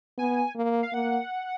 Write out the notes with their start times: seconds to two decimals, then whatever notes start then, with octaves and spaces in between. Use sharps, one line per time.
0.18 B3 G#5
0.56 A#3
0.83 F5
0.93 A#3 F#5